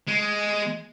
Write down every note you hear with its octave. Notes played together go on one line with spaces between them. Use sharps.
G#3